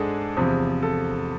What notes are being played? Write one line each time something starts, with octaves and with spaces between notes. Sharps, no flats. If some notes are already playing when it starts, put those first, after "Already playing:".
Already playing: G#2 G#3 D4 G#4 A4
E2 C3 F3
A4